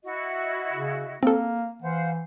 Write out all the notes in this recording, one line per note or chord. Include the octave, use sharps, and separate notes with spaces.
E4 F#4 D#5
C#3
A#3 C4 A4
E3 C5 F5 F#5